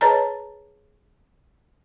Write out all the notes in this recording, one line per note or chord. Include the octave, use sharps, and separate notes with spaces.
G#4 B4 C#5 D#5 A5 A#5